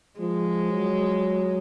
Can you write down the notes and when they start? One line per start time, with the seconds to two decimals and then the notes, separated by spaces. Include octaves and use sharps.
0.20 F3 G#3
0.71 F#3